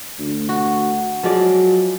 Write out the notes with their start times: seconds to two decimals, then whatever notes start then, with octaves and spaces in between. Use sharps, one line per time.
0.19 D2
0.49 F#4
1.23 F3 F#3 G#3 D5